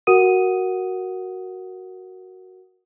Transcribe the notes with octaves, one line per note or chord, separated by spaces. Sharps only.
F#4 A#4 F#5 D#6 D#7